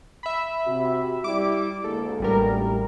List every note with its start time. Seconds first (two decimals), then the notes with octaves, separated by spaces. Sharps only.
0.23 E5 B5
0.66 C3 F#4
1.24 G3 E4 G4 D6
1.84 D2 G#3 A#3 A4
2.20 A1 G3 A#4